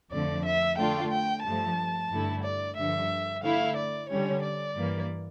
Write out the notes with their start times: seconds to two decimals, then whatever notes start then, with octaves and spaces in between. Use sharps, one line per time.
0.11 F2 D3 F3 A3 D5
0.45 E5
0.78 D3 A3 D4 F4 G5
1.11 G5
1.44 G2 F3 A3 A5
2.11 G2 D3 A3 E4
2.43 D5
2.76 G2 D3 F3 E5
3.43 D3 A3 E4 F5
3.76 D5
4.09 D3 G3 C#4 C#5
4.42 D5
4.75 G2 E3 A#3